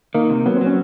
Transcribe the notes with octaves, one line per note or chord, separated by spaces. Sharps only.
D#3 A#3
C3
F#3 B3
F#3 C4
C#4